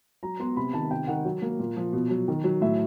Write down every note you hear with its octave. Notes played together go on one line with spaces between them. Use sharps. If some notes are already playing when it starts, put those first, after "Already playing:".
F#3 A#5
B3 C6
C3 B5
D#3 A5
C3 G5
D#3 F#5
F#3
A#3
A#2
F3
B2
F#3
D#3
F#3
A2 E5